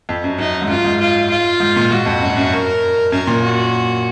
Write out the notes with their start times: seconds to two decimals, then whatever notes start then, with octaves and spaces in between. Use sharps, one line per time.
0.09 F2
0.24 F#2
0.38 F#2 D#4
0.62 G#2
0.69 F#2 F4
0.85 G#2
1.00 F4
1.29 F4
1.60 G#2
1.76 A#2
1.91 G#2 F#4
2.06 F2
2.21 F#2
2.37 F#2
2.52 A#4
3.12 F#2 A#4
3.27 A#2
3.43 F#4